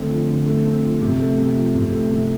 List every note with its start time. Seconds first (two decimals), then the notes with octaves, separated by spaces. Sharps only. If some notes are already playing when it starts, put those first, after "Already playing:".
Already playing: D3 A3 C4
0.10 F3
0.28 D3
0.46 A3
0.65 C4
0.83 F3
1.01 C3
1.20 A3
1.38 C3
1.56 F3
1.74 C3
1.92 A3
2.10 C3